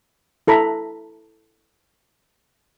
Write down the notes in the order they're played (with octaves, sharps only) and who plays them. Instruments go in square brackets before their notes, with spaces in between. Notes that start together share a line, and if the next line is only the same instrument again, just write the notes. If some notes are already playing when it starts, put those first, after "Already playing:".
[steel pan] E4 A4 A#5 B5